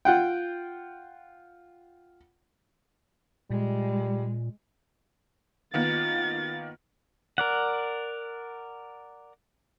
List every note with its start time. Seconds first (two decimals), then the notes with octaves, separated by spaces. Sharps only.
0.05 F4 F#5 G5
3.50 A#2 G3 G#3
5.74 D#3 A#3 B3 F4 A6
7.38 A#4 D5 F#5